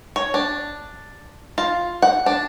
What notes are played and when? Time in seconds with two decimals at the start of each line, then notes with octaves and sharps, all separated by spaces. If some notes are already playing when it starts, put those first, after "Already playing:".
0.16 C#5
0.34 D4
1.58 F4
2.02 F#5
2.26 D4